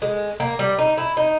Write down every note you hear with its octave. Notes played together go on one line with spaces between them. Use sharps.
G#3
A#3
G3
D#4
E4
D#4